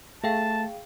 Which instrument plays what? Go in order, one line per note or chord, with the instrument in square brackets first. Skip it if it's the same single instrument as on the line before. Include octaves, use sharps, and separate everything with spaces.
[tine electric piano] A3 [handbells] G#4 F5 G5 [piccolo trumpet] A5